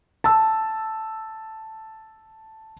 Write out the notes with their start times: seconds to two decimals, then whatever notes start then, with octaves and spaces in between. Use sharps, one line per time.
0.24 A5 E6